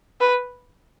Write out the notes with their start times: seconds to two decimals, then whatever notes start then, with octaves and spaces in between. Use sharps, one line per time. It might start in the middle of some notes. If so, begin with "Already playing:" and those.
0.20 B4